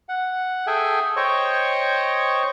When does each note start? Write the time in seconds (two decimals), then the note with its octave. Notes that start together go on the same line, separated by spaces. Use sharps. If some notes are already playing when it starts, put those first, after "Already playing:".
0.09 F#5
0.67 G#4 A4 E5 G5 G#5
1.17 C5 C#5 D#5 G5 C#6